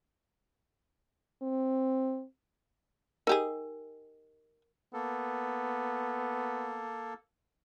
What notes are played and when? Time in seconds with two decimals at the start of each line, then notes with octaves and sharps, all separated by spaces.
1.43 C4
3.27 D#4 G4 G#4 A#4
4.93 A#3 B3 A4